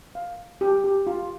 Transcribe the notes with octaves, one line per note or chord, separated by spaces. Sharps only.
F5
G4
G4
F4